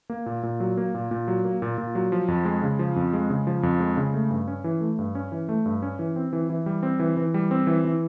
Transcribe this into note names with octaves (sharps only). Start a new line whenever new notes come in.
A#3
A#2
A#2
F#3
A#3
A#2
A#2
F#3
A#3
A#2
A#2
F#3
F3
F2
G#3
C#3
F3
F2
G#3
C#3
F3
F2
G#3
C#3
A3
G2
C#4
E3
A3
G2
C#4
E3
A3
G2
C#4
E3
C4
E3
E3
G3
C4
E3
E3
G3
C4
E3
E3